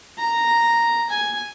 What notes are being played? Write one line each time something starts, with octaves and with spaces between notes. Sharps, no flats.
A#5
G#5